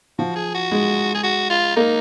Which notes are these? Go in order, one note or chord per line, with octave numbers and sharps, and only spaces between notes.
F3 F#4
G#4
F#4
G#3
G#4
F#4
F4
A#3 D#4